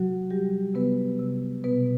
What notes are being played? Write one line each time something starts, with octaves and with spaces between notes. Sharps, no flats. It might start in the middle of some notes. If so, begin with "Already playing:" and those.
Already playing: C3 F#3 F#4
G3 G4
C3 B3 B4
C3
B2 B3 B4